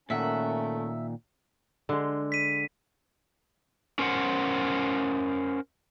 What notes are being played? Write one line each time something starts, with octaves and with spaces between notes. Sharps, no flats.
A#2 D#3 A3 C#4 A#4 E5 F#5
D3 G#3
B6 D#7
C#4 A#4 C5 D#5 F#5